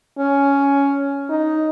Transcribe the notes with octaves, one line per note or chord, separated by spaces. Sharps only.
C#4
D#4